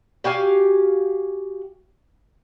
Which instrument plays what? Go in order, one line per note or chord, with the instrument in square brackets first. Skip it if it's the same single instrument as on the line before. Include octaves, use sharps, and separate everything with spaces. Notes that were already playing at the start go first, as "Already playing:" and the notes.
[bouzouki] F#4 G4 F5 G#5